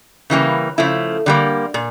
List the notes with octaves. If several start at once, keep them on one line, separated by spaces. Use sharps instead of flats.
C#3 E3 G3 A#3
C#3 F3 A3 E4
D3 G3 A#3
A#2